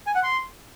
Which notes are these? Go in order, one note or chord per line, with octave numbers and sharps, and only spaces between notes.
G#5
F#5
C6